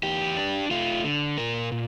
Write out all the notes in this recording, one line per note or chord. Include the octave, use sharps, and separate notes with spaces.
E2 G4
D4
A3 F4
D3
A#2 A#4
A#2